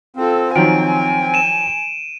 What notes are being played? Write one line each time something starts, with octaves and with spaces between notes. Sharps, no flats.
C4 F4 A4
D#3 F3 F#3 G#5 D7
D#7 E7